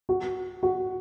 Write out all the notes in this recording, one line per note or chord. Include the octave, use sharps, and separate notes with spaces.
F#4
F#4